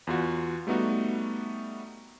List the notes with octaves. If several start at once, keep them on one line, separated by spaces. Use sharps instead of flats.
E2 F4 F#4
G3 A3 B3 D#4 F#4